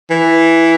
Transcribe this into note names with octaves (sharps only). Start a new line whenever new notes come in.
E3